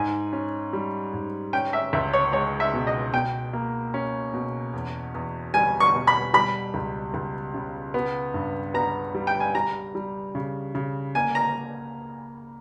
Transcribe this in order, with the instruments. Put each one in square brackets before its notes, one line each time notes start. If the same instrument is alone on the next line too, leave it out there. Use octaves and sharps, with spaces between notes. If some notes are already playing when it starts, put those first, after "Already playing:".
Already playing: [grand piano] G#2 [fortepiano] G#5
[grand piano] C#4
G3
G#2
[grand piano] C#4 [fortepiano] G5
[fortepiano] E5
[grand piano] C#2 [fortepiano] E5
[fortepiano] C#5
[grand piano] G#3 [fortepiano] C#5
[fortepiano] E5
[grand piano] B2
[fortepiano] D#5
[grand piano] B2 [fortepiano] G5
[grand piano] A#3
C#4
B2
E2
E2
[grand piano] G3 [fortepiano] G#5
[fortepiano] C#6
[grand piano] B2
[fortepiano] B5
[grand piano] G3 [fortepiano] B5
[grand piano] C#2
C#2
C#3
B3
G2
[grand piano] B3 [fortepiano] A#5
[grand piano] G3
[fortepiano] G5
G#5
[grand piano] G3 [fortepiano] A#5
[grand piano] G3
C#3
C#3
[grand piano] A#3 [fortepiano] G#5
[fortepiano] A#5